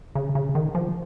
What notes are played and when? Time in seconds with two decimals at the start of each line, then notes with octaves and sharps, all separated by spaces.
0.15 C#3
0.35 C#3
0.55 D#3
0.75 F3